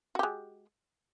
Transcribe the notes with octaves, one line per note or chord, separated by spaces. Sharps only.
G#3 F#4 G4